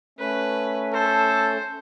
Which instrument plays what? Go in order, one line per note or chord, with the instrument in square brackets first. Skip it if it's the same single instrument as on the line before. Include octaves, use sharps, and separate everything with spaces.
[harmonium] A3 C#4 [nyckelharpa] B4
[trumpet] A4 [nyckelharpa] C5